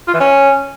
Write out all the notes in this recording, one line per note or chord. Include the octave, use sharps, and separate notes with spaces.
F4
E3
C#4